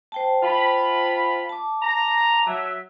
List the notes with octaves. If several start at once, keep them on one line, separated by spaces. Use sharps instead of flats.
C5 G5 A5
F4 B5
A5 D6
A#5
F#3 E5